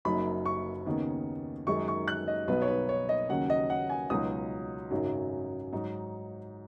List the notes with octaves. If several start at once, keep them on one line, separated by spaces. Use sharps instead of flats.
F#1 F#2 F#3 D#4 B5
C#6
D#2 C#3 B3 D#4
F#2 D#3 G#3 D#4 C#6
C#6
F#6
D#5
B1 B2 B3 D#4 B4
C#5
B4
C#5
D#5
D#2 C#3 F#3 C#4 F#5
D#5
F#5
G#5
C#2 B2 F#3 D#4 D#6
G#1 F#2 C#3 F#3 D#4
G#2 F#3 D#4